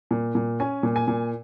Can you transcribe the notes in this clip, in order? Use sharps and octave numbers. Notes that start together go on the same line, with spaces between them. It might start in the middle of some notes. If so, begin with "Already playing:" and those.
A#2
A#2
C#4 G#5
A#2
G#5
A#2